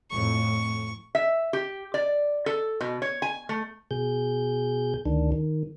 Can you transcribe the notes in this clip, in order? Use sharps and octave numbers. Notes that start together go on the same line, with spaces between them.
F2 A2 C#6
E5
G4
D5
A4
B2
C#5
G#5
A3
B2 G#4 G6
D2 D#3 D4
D#3